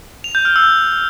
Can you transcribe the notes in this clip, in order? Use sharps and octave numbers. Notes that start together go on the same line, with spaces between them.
F7
G6
F6
E6